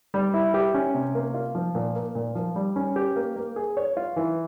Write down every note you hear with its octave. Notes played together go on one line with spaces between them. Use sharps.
G3
E4
G4
C#4
C3
A#3
F4
F3
A#2
A#3
A#2
F3
G3
C#4
G4
A#3
A#3
G#4
C#5
F4
E3